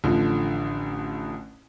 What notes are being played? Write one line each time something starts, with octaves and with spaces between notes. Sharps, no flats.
A1 D3 F3